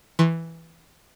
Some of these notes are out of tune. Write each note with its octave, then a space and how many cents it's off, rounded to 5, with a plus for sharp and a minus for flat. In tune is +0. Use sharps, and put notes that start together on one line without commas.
E3 +0 C6 +45